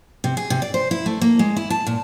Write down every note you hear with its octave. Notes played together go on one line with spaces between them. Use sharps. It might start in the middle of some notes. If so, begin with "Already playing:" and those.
C3
G#4
C3
D5
C5
E4
A3
A#3
G#3
E4
A5
A#2